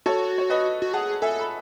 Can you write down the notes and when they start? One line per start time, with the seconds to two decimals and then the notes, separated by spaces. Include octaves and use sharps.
0.06 F#4 A4 C#5
0.38 C#5
0.50 B4 D#5
0.82 F#4
0.93 G#4 F#5 A5
1.22 A4 E5 G#5
1.39 B5